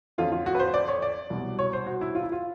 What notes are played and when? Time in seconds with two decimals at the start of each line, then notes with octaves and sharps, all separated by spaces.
0.18 F2 D3 F3 A3 C#4 F4
0.32 F4
0.46 F#4
0.55 B4
0.59 C5
0.74 D5
0.88 C#5
1.02 D5
1.30 C2 B2 F#3
1.59 C#5
1.73 C5
1.86 F#4
2.01 E4
2.15 F4
2.23 E4
2.32 F4